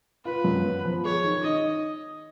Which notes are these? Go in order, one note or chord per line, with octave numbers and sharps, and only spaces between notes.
F4 B4
F#2
B3
F3
G#4 C#5
D#3
D#4 D#5